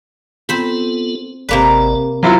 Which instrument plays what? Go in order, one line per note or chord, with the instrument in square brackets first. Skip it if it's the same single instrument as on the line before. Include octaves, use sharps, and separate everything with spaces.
[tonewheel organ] B3 F4 A4 [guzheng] C4 C5 B5
[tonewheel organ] G#1 D5 A5 [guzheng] C3 A#3 B4
[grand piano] F#3 E4 F4 [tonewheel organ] C5